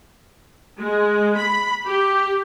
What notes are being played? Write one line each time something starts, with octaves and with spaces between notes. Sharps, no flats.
G#3
B5
G4